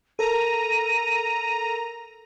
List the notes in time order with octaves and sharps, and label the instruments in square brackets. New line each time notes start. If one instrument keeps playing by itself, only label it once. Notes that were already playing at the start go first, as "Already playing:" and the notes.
[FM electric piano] A4 A#4 [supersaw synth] A#5 [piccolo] D#7